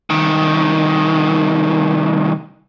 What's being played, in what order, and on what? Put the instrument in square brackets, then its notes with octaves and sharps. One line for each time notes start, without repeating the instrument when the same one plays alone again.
[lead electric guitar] C2 D#3